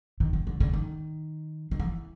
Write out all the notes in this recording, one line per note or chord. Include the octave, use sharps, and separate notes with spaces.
D#3
D#3
D3
D3
D#3
D#3
E3